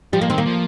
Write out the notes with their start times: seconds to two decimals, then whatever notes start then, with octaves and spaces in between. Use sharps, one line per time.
0.13 F3 G3
0.21 A#3
0.30 D#3 C4
0.38 A#3
0.46 F3